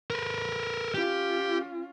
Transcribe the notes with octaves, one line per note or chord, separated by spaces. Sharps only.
A#4 B4
C#4 F4 G4